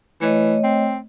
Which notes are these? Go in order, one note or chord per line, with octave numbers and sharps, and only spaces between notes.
E3 A3 C#5 D#5
C4